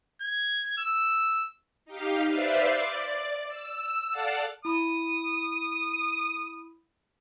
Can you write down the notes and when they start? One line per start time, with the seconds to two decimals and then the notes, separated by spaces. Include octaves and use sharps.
0.21 G#6
0.78 E6
1.85 D#4 G4 F5
2.26 B4 C5 D5 E5 F5 C6
2.71 D5
3.48 E6
4.10 A4 D5 F5 F#5 A5
4.65 E4 B5 D#6